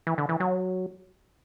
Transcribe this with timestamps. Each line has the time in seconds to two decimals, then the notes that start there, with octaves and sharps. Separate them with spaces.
0.07 E3
0.18 D3
0.29 E3
0.40 F#3